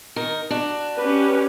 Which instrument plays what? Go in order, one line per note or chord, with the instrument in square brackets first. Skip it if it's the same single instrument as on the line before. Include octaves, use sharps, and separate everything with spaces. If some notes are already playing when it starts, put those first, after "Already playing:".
[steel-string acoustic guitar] D#3 A#4
D4 F#4
[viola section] C#4 G4 B4